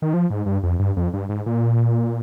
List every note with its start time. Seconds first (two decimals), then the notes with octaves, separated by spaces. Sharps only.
0.02 D#3
0.14 F3
0.30 G#2
0.46 G2
0.63 F2
0.79 G2
0.97 F2
1.14 G2
1.29 G#2
1.46 A#2